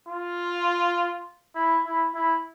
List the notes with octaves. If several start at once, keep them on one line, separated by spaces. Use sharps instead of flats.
F4
E4
E4
E4